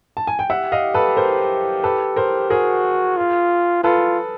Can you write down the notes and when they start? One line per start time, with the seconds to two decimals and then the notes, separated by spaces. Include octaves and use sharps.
0.17 A5
0.27 G#5
0.39 G5
0.50 G4 E5 F#5
0.72 D#5 F5
0.94 A4 B4
1.17 A#4 C5
1.83 A4 B4
2.16 A#4 C5
2.50 F#4 G#4 A#4
3.17 F4
3.84 F4 A4 B4